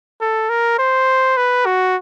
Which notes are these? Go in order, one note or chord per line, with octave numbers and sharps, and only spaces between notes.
A4
A#4
C5
B4
F#4